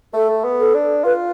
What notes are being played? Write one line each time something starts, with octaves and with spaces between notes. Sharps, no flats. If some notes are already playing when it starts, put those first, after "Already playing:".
A3 A4
B3
A4
D4
F4 B4